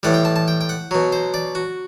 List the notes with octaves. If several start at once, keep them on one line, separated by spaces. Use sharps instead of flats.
A2 E3 G3 F#5
G5
A5
A5
G5
G5
F#5
B2 F#3
C5
D5
F#4